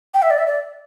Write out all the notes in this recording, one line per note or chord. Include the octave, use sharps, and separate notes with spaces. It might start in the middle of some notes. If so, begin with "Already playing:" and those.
G5
E5
D5
E5
D5